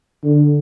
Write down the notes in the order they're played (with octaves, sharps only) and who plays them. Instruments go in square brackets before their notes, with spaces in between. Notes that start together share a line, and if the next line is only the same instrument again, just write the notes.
[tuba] D3